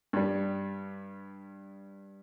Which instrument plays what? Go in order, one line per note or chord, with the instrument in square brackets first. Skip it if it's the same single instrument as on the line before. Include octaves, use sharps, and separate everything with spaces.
[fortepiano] G2 G3